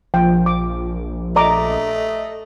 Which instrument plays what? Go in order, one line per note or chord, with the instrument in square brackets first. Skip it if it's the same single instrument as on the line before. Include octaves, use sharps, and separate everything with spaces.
[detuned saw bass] A#1 [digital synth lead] F3 [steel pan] G5
[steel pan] D6
[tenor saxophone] A3 [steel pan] D5 A#5 D6 [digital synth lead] D#5